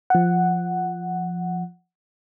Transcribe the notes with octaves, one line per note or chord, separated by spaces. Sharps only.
F3 F#5